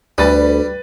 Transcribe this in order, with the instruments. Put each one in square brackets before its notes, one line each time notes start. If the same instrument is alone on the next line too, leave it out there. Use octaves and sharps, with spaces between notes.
[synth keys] D2 [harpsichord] G3 [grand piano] B4 A6